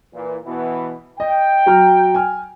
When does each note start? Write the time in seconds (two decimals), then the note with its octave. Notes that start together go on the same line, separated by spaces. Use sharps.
0.14 A#2 E3
0.45 B2 E3 B3
1.20 D#5 G5
1.66 F#3 A#5 F6
2.14 G#5 F6